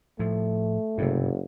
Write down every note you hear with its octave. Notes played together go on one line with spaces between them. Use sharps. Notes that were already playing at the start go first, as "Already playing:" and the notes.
A2 F3 A3
F#1 G2 C3